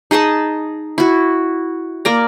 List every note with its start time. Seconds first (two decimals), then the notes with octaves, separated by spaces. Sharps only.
0.11 D#4 G#4 D#5 A5
0.98 E4 F#4
2.05 A#3 D5 A#5